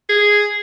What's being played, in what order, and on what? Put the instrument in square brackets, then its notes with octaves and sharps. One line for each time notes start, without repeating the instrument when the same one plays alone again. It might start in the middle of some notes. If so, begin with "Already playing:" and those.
[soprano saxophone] G#4